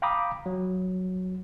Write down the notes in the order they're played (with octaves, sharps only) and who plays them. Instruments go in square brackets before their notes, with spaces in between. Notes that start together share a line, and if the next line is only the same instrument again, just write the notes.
[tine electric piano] F5 G5 A#5 B5 D6 D#6
F#3